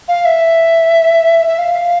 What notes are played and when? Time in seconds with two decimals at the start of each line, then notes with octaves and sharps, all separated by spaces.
0.08 F5
0.25 E5
1.48 E5
1.58 F5